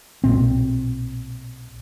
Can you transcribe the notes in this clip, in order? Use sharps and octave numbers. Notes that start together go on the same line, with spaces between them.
B1 A#2 C4